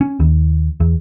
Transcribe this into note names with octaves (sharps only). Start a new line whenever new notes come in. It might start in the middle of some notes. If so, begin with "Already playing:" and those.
C#4
D#2
E2